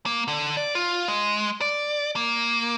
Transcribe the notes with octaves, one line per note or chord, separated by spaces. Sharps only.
A#3
D3
D5
F4
G#3
D5
A#3